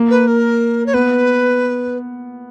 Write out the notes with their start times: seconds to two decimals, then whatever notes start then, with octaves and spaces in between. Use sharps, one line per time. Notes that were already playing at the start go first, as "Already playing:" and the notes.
Already playing: A#3
0.10 B4
0.27 A#4
0.86 C#5
0.94 B3 B4